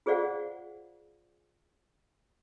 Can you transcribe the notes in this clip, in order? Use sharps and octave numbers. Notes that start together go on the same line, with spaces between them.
F4 G#4 C5 D5 F5 F#5